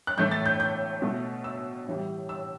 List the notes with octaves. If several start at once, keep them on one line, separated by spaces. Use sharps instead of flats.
F#6
A2 E3 A3 G6
A6
G6
G6
B2 A3
E6
A2 E3 G3
E6